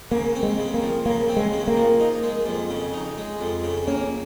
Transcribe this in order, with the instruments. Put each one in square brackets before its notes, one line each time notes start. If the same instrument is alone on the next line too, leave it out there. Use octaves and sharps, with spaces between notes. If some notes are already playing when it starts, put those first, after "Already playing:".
[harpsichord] C#3 [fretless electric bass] A#3
[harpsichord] C4
[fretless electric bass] G#3
[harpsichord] C#3
[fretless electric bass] A#3
[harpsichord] F3
[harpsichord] C#3 [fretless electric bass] A#3
[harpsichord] C4
[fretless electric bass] G#3
[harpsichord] C#3
[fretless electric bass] A#3
[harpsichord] F3
D#4
G#3
F2
C#3
D#4
G#3
F2
C#3
[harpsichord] A#3 [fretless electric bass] C#4